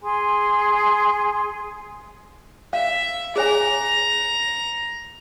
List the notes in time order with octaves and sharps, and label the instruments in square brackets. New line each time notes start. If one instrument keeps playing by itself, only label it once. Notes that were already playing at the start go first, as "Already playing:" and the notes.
[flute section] G#4 G#5 C6
[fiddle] E5 [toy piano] F5
[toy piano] G#4 C#5 G#5 [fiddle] A#5